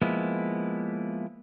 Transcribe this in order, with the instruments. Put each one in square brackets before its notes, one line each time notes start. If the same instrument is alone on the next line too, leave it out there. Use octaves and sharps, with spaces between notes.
[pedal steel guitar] F3 G#3 A#3 B3 E4